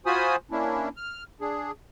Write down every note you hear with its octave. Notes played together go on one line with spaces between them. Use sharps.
F4 F#4 C5 G#5 B5 D#6
A#3 C#4 D4 E4
F6
D4 G#4